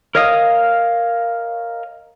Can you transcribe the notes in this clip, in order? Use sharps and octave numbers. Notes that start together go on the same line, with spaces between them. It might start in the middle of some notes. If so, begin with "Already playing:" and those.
A#4 C#5 D#5 F5 D#6